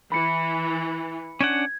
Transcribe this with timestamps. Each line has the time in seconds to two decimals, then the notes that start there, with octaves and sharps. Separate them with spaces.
0.12 E3 B5 C#7
1.40 C#4 D4 F#5 G#6